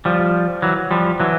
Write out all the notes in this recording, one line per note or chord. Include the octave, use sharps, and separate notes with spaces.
F3 G3
E3 F#3
F3 G3
E3 F#3